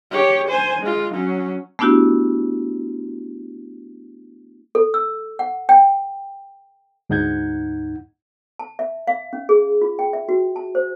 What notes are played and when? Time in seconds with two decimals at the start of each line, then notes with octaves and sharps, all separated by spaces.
0.12 G4 C#5
0.49 C5 G#5
0.82 G#3 F4
1.13 F#3 C#4
1.79 A3 B3 D4 E4 F#4 G4
4.75 A4
4.94 E6
5.39 F#5
5.69 G5
7.10 D2 G#2 D#4 F#5 G6 G#6
8.59 A5
8.79 E5
9.07 F5
9.33 C#4
9.49 G#4
9.82 F4
9.99 G5
10.13 E5
10.29 F#4
10.56 A5
10.75 C5